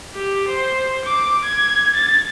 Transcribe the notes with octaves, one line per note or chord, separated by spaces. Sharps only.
G4
C5
D6
G#6
A6